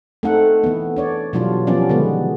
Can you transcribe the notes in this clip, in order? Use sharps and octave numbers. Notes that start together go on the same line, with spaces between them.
A3 C4 D#4 A4 F#5
E3 B3
D4 C#5 D5
B2 E3 F#3 G3 D4 F4
F3 G3 B3 C#4 D4 D5
D3 D#3 G#3 B3